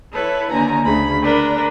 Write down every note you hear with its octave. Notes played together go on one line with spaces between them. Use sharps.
E4 A4 B4 C#5
D#2 D3 G#5 A#5
D2 C#3 B5
D4 A#4 B4